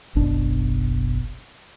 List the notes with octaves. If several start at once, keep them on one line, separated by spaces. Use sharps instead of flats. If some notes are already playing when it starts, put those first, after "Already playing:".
F#1 B1 B2 D4